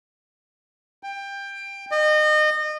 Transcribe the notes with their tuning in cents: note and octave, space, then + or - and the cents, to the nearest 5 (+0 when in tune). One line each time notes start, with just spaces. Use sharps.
G5 +20
D#5 -30